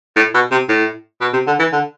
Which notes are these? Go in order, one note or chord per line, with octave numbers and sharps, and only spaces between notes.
A2
B2
C3
A2
B2
C3
D3
E3
D3